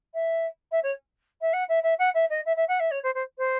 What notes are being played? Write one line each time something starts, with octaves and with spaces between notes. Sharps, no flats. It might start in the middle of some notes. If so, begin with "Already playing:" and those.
E5
E5
C#5
E5
F#5
E5
E5
F#5
E5
D#5
E5
E5
F#5
E5
C#5
C5
C5
C5